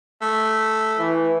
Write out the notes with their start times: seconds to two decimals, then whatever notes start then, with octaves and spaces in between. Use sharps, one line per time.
0.22 A3
0.99 E3